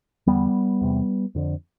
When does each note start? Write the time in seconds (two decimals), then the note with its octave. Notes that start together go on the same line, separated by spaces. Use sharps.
0.27 E2 D3 G3 B3
0.81 E2 C3
1.35 F2 D3